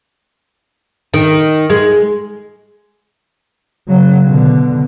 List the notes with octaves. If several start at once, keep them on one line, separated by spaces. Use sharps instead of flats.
D#3
G#3
C#3 F#3
B2 D3